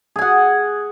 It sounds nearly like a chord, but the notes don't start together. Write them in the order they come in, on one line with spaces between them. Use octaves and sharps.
G#4 G#5 F#5